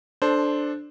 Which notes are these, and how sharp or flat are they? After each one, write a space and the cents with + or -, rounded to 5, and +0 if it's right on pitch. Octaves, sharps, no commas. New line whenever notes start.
D4 +5 A4 -15 C5 +0